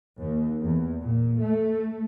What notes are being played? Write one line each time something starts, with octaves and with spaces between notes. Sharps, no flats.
D#2
E2
A#2
A3